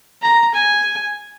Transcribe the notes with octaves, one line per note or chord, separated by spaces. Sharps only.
A#5
G#5